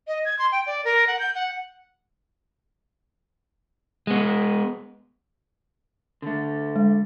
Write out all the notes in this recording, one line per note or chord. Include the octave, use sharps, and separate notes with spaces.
D#5
G#6
C6
G5
D5
A#4
F#5
G6
F#5
G#3 B3
D3 A3
G#3